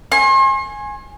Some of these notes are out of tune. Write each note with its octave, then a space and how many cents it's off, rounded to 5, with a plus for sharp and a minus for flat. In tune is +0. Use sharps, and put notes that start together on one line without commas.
G#5 +0 C6 +45